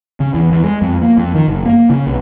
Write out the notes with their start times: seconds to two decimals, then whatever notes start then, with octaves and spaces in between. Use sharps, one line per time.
0.20 C#3
0.34 E2
0.51 E2
0.64 G#3
0.82 F2
1.02 A#3
1.17 F2
1.35 D#3
1.48 F#1
1.66 A#3
1.90 C#3
2.07 B1